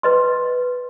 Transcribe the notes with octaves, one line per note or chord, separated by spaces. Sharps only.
B4 D#5 C6